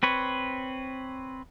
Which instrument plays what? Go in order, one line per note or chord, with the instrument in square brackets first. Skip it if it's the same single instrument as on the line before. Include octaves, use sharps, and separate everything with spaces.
[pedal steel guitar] C4 B4 C#5